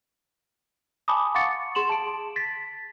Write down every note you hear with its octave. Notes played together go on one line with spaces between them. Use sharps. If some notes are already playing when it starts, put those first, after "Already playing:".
G#5 A5 B5 D6 D#6
F5 F#5 C#6 D6 A6 C#7
G#4 C6 E7 F#7
A5 D7
A6 B6